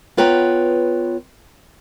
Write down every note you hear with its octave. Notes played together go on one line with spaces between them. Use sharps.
B3 F4 B4 C#5 G5 A#5